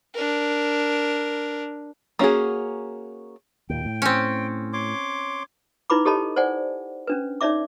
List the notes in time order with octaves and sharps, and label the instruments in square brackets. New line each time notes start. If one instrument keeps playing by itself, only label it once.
[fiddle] D4 A#4
[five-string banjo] A#3 C#4 F4 F#4 G#4
[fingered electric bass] D#2 A#2 [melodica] G5
[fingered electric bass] A2
[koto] C4 C#4
[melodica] C#5 C6 D6
[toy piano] D#4 E4 B4 B5 D6
G4 A4 C#5 D#5 A5 B5
C5 D5 F#5 G#5
C#4 D4 B4
D#4 C#5 D5 E5 D6